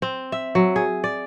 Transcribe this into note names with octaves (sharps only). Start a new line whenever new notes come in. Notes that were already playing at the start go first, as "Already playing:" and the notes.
C4
E5
F#3
G#4
D5